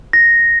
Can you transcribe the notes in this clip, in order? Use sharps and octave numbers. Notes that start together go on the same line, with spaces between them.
A#6